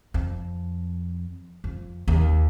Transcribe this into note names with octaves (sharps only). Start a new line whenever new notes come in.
F2
F2
D#2